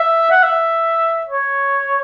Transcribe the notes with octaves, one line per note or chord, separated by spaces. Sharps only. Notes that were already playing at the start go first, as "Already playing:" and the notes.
Already playing: E5
F#5
E5
C#5